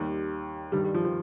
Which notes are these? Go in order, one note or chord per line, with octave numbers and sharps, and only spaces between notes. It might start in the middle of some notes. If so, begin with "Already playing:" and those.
Already playing: D#2 D#3 G3
G2 D#3 G3
G3
F3
F3